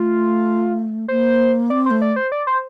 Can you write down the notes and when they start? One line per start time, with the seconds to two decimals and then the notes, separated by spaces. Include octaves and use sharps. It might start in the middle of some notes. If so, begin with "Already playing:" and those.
Already playing: A3 F4
1.08 A#3 C5
1.70 C4 D5
1.86 A3 C5
2.02 D5
2.16 C5
2.32 D5
2.47 C5